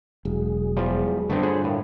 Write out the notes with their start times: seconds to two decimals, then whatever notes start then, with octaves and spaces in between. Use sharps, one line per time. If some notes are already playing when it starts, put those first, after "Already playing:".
0.25 E1 F#3 G#3 G#4
0.77 E2 F3 G3
1.30 G2 D3 A3 B3 C4
1.43 F4 G#4 C5 C#5 F#5 B5
1.64 A2 A#4 F5 G5